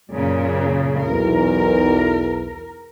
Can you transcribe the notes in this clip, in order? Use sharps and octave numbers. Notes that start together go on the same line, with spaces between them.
F#2 A#2 C#3
B1 E2 A#4